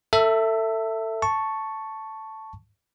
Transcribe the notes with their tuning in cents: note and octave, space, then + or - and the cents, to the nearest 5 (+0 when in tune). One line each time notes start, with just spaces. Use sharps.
A4 +25 E5 +5
A5 +0 C#6 +0